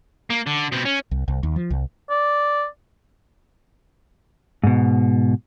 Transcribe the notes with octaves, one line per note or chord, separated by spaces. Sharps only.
A#3
D3
B2 C4
C#4
C2
C2
D#2
F3
C2
D5
G#2 B2